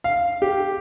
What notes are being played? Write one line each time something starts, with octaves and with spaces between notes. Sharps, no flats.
F5
G4